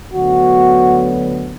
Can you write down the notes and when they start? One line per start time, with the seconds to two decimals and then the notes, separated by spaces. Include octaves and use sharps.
0.12 D2 D3 F#3 B3 F#4